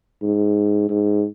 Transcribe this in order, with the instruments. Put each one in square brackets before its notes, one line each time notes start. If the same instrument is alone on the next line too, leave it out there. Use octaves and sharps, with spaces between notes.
[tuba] G#2
G#2